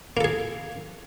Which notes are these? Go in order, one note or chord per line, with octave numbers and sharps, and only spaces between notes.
A#3 G#4 A4